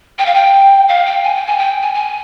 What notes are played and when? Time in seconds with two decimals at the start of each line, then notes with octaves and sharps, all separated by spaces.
0.19 G5
0.26 F5
0.34 G5
0.89 F5
1.06 G5
1.23 G#5
1.36 G5
1.47 G#5
1.58 G5
1.82 G#5
1.94 G#5